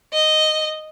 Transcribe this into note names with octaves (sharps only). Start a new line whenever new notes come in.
D#5